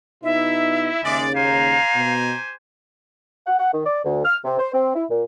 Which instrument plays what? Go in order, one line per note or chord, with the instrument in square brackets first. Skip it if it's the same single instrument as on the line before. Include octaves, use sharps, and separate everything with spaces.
[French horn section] B2 B3 D#4 [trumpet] E4 [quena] E5
[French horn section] D#2 C#3 [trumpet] G#3 [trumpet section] D5
[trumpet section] G4 C5 G#5 [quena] F5 [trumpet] A#5
[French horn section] B2
[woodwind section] F#5
F#5
D#3
D5
D2
F6
C3
C5
C4
E4
A#2